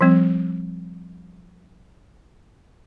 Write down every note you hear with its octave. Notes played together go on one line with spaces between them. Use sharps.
F3 G3 C4